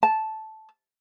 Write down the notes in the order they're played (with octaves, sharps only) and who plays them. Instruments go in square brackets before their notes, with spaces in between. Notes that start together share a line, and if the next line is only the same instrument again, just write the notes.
[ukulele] A5